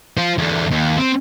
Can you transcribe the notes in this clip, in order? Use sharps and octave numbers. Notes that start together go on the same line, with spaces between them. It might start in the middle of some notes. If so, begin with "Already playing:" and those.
F4 C5
E2 D3
D#2
C4